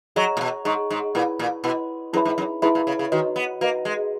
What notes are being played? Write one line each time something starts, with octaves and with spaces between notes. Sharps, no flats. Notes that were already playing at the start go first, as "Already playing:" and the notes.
F#3 G#4 D#5 A#5 C#6
A#2
B2
G#2 G#4 D#5 A#5 C#6
G#2
A#2 E4 B4 F#5 B5
A#2
B2 E4 B4 F#5 B5
F#2 E4 G#4 B4 E5 B5
G#2
F#2
G#2 E4 G#4 B4 E5 B5
A#2
C#3
C#3
D#3 F#4 B4 D#5
B3
A#3 F#4 B4 D#5
G#3